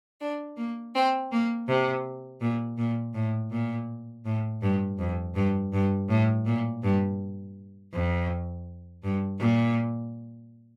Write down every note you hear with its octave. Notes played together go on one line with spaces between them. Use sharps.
D4
A#3
C4
A#3
C3
A#2
A#2
A2
A#2
A2
G2
F2
G2
G2
A2
A#2
G2
F2
G2
A#2